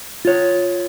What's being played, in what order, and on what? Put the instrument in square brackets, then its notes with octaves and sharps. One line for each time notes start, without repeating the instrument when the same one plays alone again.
[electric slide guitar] F4 C#5